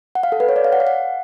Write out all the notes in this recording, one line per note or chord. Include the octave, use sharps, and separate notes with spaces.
F#5
F5
A4
B4
C#5
D5
F5
F#5
F5
F#5